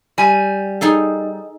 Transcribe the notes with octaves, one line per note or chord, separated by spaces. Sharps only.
G3 G#5
D#4 G#4 A4